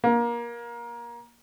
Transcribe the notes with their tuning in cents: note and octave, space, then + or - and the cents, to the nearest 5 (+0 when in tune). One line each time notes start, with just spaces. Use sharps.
A#3 +25